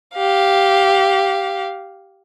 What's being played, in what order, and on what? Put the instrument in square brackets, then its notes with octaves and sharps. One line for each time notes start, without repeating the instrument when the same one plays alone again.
[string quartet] G4 F5